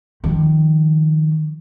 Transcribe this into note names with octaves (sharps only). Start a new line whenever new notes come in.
D#3 F3